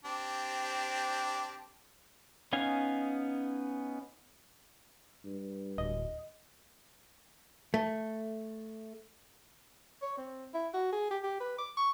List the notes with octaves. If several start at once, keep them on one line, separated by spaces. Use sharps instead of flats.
C4 D4 G4
B3 C#4 D#4 F5 G#5
G2
D1 D#5
A3
C#5
C4
E4
F#4
G#4
G4
G4
B4
D6
C#6